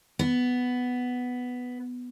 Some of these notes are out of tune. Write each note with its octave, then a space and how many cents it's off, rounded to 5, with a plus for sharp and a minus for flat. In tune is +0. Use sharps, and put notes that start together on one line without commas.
B3 +5